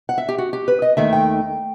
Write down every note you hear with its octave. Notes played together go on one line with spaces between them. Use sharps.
F#5
E5
G4
F#4
G4
B4
D#5
D#2 D#3 A3 E5
G5